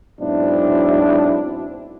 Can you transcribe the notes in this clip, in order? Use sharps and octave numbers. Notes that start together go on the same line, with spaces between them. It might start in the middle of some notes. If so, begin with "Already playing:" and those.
G#2 B2 F#3 C4 D4 E4